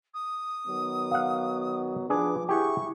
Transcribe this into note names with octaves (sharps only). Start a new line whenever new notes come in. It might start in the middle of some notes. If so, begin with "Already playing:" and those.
D#6
D#3 F#3 B3
F5 F#5
F3 D4 G#4 B4 D6
E4 G4 G#4 F#5 C#6